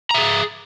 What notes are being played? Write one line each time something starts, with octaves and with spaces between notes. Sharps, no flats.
G#4 E5 A#5